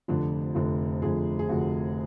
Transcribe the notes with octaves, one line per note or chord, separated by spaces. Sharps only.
F1 F2 D3 D4
F1 F2 D3
F1 F2 D3 G#4
G#4
F1 F2 D3 F#4